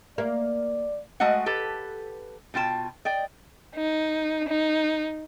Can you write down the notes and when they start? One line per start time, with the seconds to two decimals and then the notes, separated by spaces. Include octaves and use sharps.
0.18 A#3 D5
1.20 G#3 A3 F#4 D#5 F#5
1.46 G4 A4 B4
2.54 B2 F4 G5 A5
3.05 D5 D#5 G5
3.76 D#4
4.48 D#4